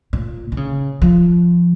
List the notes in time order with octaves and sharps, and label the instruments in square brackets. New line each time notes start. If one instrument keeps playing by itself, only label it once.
[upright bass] A#2
D#3
C#3
F3